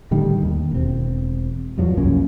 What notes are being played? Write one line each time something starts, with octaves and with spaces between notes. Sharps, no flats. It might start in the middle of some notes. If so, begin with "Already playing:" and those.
A2 D3 D#3 G3
D#2
E1 C4
E2 G2 F3 F#3
C2 F#2 A#3 C#4